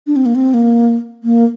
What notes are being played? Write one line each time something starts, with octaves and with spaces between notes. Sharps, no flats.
D4
C4
A#3
C4
A#3
A#3